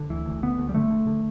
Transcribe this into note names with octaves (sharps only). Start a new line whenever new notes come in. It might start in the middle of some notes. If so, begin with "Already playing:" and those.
Already playing: D3
D2 E3
D2
D3 B3
D2
G3
D3 A3
D3
D3